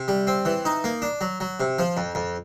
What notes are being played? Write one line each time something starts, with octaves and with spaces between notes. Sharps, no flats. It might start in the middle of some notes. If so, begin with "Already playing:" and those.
Already playing: C3
G3
C4
E3
D#4
A#3
D4
F#3
F#3
C3
F3
F2
F2